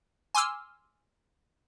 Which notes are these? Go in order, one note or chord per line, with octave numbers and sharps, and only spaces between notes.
G#5 C6 D6 E6 F6